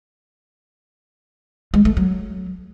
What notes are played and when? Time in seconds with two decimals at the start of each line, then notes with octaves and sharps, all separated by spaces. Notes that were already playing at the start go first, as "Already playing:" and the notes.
1.74 G#3
1.85 A3
1.97 F#3